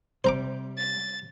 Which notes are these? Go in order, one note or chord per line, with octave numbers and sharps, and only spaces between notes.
C3 G3 C5 A#5 D6
A6